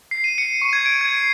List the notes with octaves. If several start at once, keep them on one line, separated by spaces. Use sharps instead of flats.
C7
D#7
C#7
C#6
G#6
D7
G#6
C7